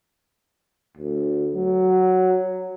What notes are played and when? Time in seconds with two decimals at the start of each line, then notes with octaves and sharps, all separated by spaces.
0.98 D2
1.55 F#3